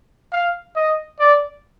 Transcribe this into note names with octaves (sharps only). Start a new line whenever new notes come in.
F5
D#5
D5